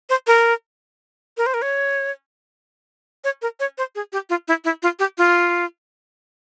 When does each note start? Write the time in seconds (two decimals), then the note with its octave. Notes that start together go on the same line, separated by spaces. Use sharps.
0.10 C5
0.27 A#4
1.37 A#4
1.46 C5
1.54 A#4
1.62 C#5
3.24 C#5
3.42 A#4
3.60 C#5
3.78 C5
3.95 G#4
4.13 G4
4.30 F4
4.48 E4
4.65 E4
4.83 F4
4.99 G4
5.18 F4